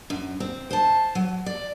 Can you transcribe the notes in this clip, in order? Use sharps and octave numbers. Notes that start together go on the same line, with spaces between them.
F#2
C4
C5 A5
F#3
D5